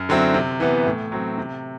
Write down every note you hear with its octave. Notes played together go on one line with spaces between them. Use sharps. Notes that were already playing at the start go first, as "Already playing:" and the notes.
Already playing: F#2
D3 F#3 C4 E4
C3
E3 B3
A2
F#3 C4
C3